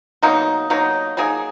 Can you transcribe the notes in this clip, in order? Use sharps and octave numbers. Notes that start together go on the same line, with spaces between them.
B2 F#3 A#3 D#4
B2 F#3 A#3 D#4
F#3 A#3 D#4 G#4